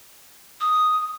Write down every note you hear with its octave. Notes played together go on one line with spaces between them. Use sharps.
D#6